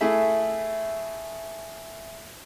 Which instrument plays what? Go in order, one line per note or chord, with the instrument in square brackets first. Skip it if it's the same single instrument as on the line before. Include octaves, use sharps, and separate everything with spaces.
[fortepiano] A3 E4 G#4 E5